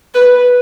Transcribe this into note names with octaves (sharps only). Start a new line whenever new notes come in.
B4